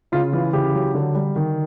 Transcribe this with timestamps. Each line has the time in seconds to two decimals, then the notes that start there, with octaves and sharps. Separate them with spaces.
0.12 C#3 F4
0.33 E3 F4
0.53 C#3 G4
0.74 F#3
0.94 D3
1.15 G3
1.36 D#3